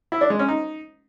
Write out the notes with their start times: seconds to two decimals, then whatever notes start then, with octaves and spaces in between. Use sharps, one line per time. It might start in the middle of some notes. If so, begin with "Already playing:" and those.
0.12 E4
0.21 D4
0.30 G#3
0.39 C#4
0.48 D#4